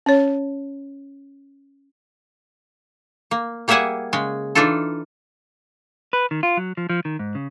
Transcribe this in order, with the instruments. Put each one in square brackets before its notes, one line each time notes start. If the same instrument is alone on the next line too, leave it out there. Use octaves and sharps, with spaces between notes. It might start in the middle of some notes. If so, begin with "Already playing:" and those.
[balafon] C#4 C#5
[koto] A#3
G3 A#3 G#4 E5 F#5 G#5
C#3 G#3
E3 D4 D#4 F4 A4
[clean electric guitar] B4
D#3
F4
F#3
F3
F3
D#3
G#2
C#3